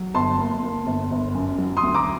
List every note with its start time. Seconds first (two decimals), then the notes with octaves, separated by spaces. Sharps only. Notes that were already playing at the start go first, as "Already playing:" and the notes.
Already playing: F#3
0.14 G1 A5 C6
0.38 A#3
0.63 A#3
0.87 G1
1.11 G1
1.34 F#2
1.58 F#3
1.77 C6 D#6
1.83 D2
1.94 A#5 D6